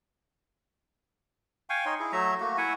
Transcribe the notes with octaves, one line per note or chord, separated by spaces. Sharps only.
F5 G5 G#5 C#6
D#4 C#5 C6
E4 G#4
F#3 A3 E5 A#5
A3 A#3 F#4
E4 E5 F#5 G#5